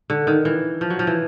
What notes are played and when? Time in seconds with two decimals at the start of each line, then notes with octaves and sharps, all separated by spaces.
0.10 D3
0.27 D#3
0.45 E3
0.81 F3
0.90 F#3
0.99 F3
1.07 E3